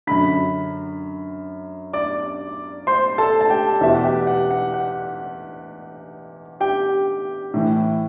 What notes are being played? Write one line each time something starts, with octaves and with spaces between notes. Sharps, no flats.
F#2 D3 B5 B6
D5 D6
C5 C6
A4 A5
A5
G4 G5
E2 B2 E5
F#5
G4 G5
F#5
F#5
F#5
G4 G5
A2 E3